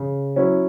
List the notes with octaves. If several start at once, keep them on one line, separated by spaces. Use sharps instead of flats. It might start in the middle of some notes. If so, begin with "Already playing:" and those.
Already playing: C#3
F#3 C#4 E4